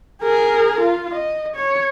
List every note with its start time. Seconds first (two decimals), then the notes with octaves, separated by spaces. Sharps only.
0.23 G#4 A#4
0.80 F4
1.12 D#5
1.56 C#5